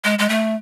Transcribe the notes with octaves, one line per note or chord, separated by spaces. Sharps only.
G#3
G#3
A3